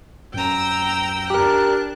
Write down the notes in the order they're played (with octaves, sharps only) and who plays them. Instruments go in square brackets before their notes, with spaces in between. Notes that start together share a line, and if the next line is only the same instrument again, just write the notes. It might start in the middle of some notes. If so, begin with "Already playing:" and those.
[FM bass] F#2 [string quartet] G5 A#5 E6
[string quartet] D4 F#6 [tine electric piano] G4 A#4